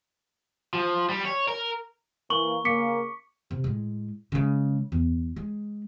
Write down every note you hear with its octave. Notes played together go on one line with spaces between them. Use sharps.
F3
G3
C#5
A#4
E3 A#3 C#6 F#7
C#3 A#3 D6 B6 C#7
C3
A2 G#3
C#3 G#3
E2
G#3